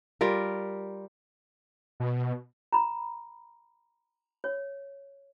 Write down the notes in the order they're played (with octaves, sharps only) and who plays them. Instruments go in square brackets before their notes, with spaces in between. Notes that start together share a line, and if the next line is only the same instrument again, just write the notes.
[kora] G3 F4 A#4
[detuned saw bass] B2
[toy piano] A#5 B5
C#5